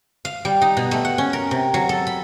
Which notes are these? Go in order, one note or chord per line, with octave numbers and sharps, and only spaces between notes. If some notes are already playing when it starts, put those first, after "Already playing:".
F5
G3
D#4
B2
A3
F#5
C#4
A#4
C3
F#3
A4
B5